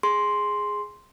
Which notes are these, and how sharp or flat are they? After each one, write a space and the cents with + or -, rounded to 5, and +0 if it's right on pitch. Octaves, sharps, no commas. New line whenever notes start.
G#4 +0 C6 +0